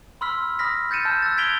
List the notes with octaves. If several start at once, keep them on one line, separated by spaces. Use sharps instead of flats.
B5 C6 E6 F6 B6
B5 D#6 F6 A#6 B6
G6 A6 C#7 D#7 E7
A5 E6 F6
E6 F#6 A6
F#6 G#6 B6 D7 F7 G7